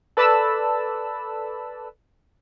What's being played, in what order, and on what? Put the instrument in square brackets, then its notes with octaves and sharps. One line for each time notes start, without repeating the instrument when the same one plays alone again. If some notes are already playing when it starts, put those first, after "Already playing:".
[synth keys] A4 B4 D5 A5 B5 E6